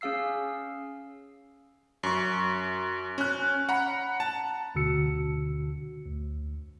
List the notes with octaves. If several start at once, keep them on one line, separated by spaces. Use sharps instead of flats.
C#4 G#4 F5 E6 C7
F#2 C#6
C#4 F#6
F#5 A#5 B5
A5
D2 B2 D3 F#4 E6 C#7
D2